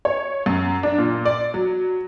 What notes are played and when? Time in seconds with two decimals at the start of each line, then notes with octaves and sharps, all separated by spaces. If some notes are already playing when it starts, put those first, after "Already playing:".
0.05 C#5
0.46 F#2
0.83 D4
0.98 A#2
1.25 D5
1.54 F#3